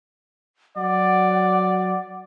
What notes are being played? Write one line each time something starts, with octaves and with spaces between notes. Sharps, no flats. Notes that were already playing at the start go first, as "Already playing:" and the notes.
F#3 D5 F#5